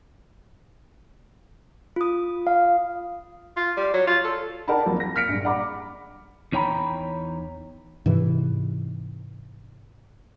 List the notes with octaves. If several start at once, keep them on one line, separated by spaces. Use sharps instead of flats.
F4 D#6
F5
F4
G3
F#3
F4
A4
A#4 D5 F#5 G5 A5 B5
F3 F#3 A#3 C4 F4
A#6
F6 B6 C#7 D7
A#1 G2
D5 F#5 A#5 B5 D6
E2 D#4 C#5 G5 A#5 B5
G#2 C3 E3